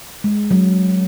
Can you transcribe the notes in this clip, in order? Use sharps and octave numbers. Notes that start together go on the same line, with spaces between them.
G#3
F#3